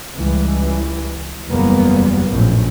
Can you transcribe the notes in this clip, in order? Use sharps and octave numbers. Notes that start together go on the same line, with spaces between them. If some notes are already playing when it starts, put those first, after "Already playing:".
C#2 E3 G3
F#1 E2 G3 A#3 B3
A#1 F#2 A2